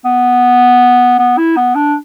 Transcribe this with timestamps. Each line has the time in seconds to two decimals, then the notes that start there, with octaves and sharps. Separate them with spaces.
0.05 B3
1.19 B3
1.37 E4
1.56 B3
1.75 D4